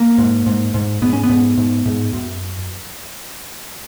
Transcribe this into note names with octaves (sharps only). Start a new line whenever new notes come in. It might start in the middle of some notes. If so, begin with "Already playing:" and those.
Already playing: A#3
G#2
G#2
G#2
G#2 B3
C#4
B3
G#2
G#2
G#2
F#2